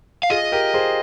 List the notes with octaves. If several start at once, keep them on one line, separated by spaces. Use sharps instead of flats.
F5
F4 G#4 D#5
G4 A#4
G#4 C5